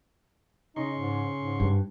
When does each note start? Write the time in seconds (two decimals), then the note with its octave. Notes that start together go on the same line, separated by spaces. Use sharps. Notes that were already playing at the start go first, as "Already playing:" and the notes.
0.76 C#3 D#4 C6 C#6
0.97 G#2
1.38 G#2
1.60 G2